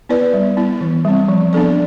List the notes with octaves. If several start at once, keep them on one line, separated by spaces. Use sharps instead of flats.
B3 E4 B4 D5
G3
B3 E4
E3
G3 C4
F3
B3 D4 A4 D5